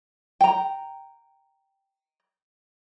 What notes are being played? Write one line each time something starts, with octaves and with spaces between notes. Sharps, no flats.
G5 A#5